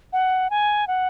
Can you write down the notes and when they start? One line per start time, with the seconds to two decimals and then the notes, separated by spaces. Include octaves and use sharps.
0.13 F#5
0.50 G#5
0.87 F#5